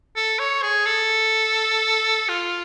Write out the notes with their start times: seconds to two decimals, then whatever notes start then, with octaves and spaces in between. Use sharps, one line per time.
0.16 A4
0.39 C#5
0.62 G#4
0.86 A4
2.28 F4